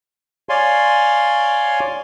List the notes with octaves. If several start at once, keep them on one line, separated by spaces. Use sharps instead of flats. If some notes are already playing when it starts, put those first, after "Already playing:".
C#5 D5 F5 G#5 C6